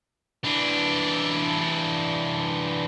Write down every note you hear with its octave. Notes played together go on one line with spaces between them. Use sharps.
E3 D4